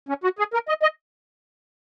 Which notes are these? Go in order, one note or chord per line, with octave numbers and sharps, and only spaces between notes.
C#4
F#4
G#4
A#4
D#5
D#5